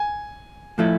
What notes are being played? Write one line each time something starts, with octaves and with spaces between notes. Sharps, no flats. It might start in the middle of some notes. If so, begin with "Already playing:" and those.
Already playing: G#5
A2 F3 A3 E4 A4